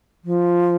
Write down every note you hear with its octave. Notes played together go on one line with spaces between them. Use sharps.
F3